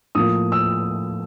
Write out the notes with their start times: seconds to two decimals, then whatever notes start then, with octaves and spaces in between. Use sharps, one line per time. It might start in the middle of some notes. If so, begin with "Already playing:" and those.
0.15 A2 F3 A#3 D#6
0.52 E6